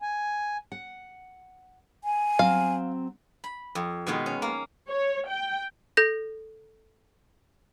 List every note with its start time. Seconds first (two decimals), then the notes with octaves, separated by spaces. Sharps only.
0.02 G#5
0.72 F#5
2.04 G#5
2.39 F#3 C4 F5
3.44 B5
3.75 F2
4.07 B2 D#3 G#3 B3
4.26 C#4
4.42 A#3
4.89 C#5
5.28 G5
5.97 A4 G6 A#6